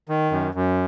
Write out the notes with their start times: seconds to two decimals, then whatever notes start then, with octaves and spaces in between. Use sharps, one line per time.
0.09 D#3
0.31 F#2
0.55 F#2